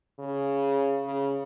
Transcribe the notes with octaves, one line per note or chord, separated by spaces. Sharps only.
C#3
C#3